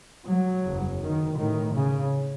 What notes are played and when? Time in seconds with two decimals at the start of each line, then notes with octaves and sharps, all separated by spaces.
0.27 F#3
0.64 F#1 E2 C#3
1.01 D#3
1.38 A1 A2 D#3
1.75 C#3